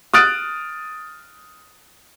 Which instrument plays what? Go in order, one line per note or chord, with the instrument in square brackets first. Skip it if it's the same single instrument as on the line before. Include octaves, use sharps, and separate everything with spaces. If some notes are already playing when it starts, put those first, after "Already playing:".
[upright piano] D#6 F6 F#6 A6 D7